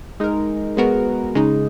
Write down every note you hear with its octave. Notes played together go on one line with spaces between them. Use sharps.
G#3 D#4 A#4
G#3 B3 F#4 A#4
C#3 G#3 D#4